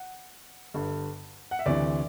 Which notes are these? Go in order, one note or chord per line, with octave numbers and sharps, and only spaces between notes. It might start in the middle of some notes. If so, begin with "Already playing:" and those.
Already playing: F#5
G1 G2 D3
F#5
E5
D2 C3 E3 D5